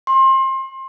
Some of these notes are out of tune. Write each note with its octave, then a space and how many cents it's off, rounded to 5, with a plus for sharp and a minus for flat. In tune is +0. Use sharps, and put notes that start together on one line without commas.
C6 +30